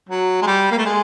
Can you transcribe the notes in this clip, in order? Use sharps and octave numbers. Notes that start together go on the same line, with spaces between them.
F#3
G#3
G3
A#3
A3
G#3